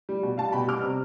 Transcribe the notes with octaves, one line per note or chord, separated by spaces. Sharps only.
G3
B2
G3 F5 A5
B2 G5 B5
G3 D6 F6
C3